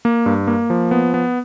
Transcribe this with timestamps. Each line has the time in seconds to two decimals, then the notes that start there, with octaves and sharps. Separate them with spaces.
0.05 A#3
0.26 G2
0.47 A#3
0.70 F3
0.91 B3
1.14 B3